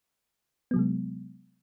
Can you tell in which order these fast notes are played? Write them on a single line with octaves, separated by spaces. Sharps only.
B3 F#3 C3 G#3